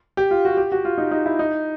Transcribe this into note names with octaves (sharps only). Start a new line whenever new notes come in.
G4
F4
F#4
G4
F#4
F4
D#4
D#4
E4
D#4